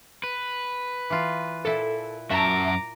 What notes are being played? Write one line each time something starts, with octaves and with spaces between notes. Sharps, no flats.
B4
E3 F4
A#2 E4 A4
F#2 F#4 E5 A5 A#5 D6